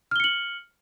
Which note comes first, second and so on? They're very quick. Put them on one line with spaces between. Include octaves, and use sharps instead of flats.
F6 G7 C#7 F#7